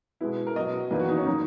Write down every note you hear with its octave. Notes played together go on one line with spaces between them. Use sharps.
B2 G#3 B3 E4
A#4
B2 F#3 B3 D#5
E2 D#3 A#3 B4
F#4
D#4
C#4
D#3 F#3 A#3 D#4